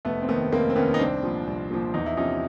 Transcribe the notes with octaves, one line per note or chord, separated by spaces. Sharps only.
F1 A3 B3
C4
D#2 D#3 A3 B3
F1 A#3 C4
C4
D#2 D#3 B3 C#4
D#4
C2 C4 D4
A#2 F3
C2
A#2 F3
E2 D#4
E4
C3 F3 C#4 D#4